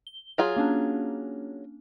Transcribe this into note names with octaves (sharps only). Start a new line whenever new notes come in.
G7
F#3 F4 G#4 A#5
A#3 C#4 D4